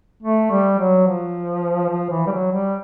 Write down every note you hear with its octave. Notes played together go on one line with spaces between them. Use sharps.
A3
G3
F#3
F3
F3
E3
G3
F#3
G3